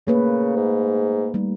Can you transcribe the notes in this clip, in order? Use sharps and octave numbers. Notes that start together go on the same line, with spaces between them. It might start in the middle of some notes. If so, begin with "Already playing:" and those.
C#3 A3 A#3 B4
G#2
G3 A3 D#4